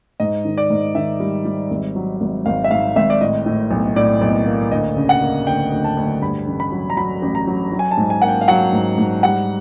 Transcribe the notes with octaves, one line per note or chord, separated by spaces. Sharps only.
G#2 D#5
D#3
D5
G#2
D#3 E5
G3
G3
G#1
F#3
G#1
G#1 F5
E5
G#2 F5
G#1 E5
D5
A2 D#5
A2
B1
A2 D5
B1
A#3
D2 D#5
C#3
F#5
A#3
D2 G5
D2
A5
D2
G2 B5
A1
B5
F#3
A#5
F#3 B5
A1
A#5
F#3
F#3
G#5
A5
G#2
G#5
A#3 F#5
G5
F5
F#3 F#5
G#2
G#2
G3 F#5